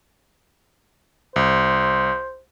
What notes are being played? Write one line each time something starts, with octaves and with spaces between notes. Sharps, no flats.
C2 C5